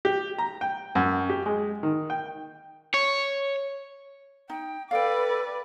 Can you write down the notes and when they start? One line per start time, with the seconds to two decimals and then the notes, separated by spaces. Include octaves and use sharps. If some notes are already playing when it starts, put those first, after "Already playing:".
0.05 G4
0.38 A#5
0.61 G5
0.95 F#2
1.29 G4
1.46 G#3
1.83 D#3
2.10 G5
2.94 C#5
4.50 D#4 G5
4.91 A4 B4 D5 F5 G5